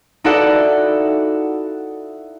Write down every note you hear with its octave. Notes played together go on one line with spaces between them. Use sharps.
D#4 E4 F#4 A4 D5 F#5